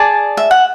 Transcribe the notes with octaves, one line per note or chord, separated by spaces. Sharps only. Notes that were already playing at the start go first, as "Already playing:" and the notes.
Already playing: G#4 D5 A5
E5
F#5